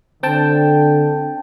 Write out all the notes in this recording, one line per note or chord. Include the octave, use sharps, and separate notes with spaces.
D3 C4 G5 A5